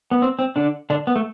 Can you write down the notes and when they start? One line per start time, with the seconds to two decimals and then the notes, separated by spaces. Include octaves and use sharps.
0.11 B3
0.22 C4
0.39 C4
0.56 D3 D4
0.90 D3 D4
1.07 B3
1.16 A3